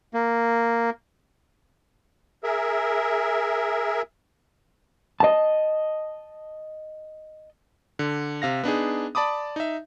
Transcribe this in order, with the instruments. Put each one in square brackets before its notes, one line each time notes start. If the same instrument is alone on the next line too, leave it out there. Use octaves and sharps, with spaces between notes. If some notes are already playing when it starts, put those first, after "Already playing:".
[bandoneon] A#3
[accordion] G#4 A#4 E5
[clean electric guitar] D#5 A5
[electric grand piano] D3
C3 F5 A#6
B3 D4 D#4 G#4
D5 A5 B5 D6 D#6
D#4 E5